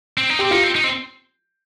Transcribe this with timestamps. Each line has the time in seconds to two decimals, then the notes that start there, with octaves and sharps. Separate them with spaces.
0.18 C4
0.30 D#4
0.39 C4 G4
0.51 D#4 F4
0.64 C4
0.76 D#4
0.84 C4